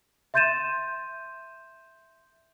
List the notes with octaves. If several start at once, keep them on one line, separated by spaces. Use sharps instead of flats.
E5 C6 G6 A6 D#7 E7